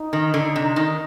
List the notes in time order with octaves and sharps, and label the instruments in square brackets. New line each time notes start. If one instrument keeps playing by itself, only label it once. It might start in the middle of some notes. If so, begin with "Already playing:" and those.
Already playing: [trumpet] D#4
[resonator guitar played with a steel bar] D#3
D3
C3
[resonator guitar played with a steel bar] D#3 [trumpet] D#4